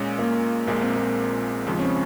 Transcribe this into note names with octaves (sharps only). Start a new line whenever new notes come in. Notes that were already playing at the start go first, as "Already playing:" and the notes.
Already playing: A#2 G#3 C#4
A#3
A#1 A#2 G#3 A#3
C4
A#3
D#2 C#3 F3 G#3
C#4
C4